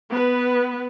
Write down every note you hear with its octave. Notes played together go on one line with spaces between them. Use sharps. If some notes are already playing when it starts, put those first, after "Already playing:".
B3 B4